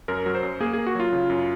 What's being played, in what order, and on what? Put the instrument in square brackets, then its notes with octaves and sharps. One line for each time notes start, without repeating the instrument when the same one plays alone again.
[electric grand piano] F#2 A#4
F#3
C5
F#2
A#3 G#4
A#3 G#4
F#4
F#3 F4
C#3
F#2